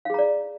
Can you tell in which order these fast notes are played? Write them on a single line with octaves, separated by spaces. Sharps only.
F5 G#4 A#5 D5